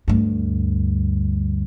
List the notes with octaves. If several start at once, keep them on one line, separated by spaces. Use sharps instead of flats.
D2 G2